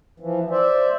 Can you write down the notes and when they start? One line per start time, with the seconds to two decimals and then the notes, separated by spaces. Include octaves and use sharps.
0.20 E3 F3
0.51 C5 D5 E5